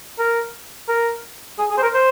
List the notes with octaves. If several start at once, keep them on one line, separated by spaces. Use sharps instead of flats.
A#4
A#4
G#4
G#4
C5
A#4
C5